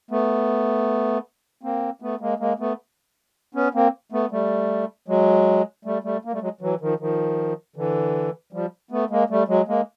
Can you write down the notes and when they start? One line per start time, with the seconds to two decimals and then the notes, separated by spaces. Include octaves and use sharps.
0.11 A3 B3
1.63 A#3 C4
2.02 A3 B3
2.21 G#3 A#3
2.40 G#3 A#3
2.59 A3 B3
3.55 B3 C#4
3.74 A#3 C4
4.12 A3 B3
4.31 G3 A3
5.08 F#3 G#3
5.85 G3 A3
6.03 G3 A3
6.25 A#3
6.32 G3 A3
6.42 F#3 G#3
6.61 E3 F#3
6.81 D#3 F3
7.00 D#3 F3
7.76 D3 E3
8.53 F3 G3
8.91 A3 B3
9.10 G#3 A#3
9.30 G3 A3
9.48 F#3 G#3
9.68 G#3 A#3